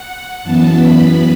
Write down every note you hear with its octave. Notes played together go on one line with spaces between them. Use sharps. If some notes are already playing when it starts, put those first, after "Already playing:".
Already playing: F#5
F#2 E3 B3 A5
B5
B5